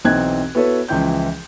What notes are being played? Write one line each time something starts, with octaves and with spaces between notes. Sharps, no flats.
B1 E3 C4 D#4 F#6 G#6
B3 E4 F#4 A4 B4 C#5
C#2 E3 F3 E4 G5 G6